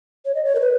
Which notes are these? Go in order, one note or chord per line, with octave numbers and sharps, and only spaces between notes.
C#5
D#5
C#5
A#4
B4